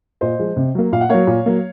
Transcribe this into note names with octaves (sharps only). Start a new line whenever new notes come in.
A#2 C5 D#5
F3 G#3
C3
F#3 A#3
A#2 F5
F#5
F#3 A#3 C#5 F5
A#2
F#3 A#3